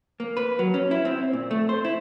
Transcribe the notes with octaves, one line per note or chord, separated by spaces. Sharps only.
A#3
B4
F#3
C#4
E4
C4
A#2
A3
C5
E4